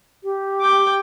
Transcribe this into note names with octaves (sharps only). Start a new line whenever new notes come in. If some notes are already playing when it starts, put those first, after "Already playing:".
G4
G5 D6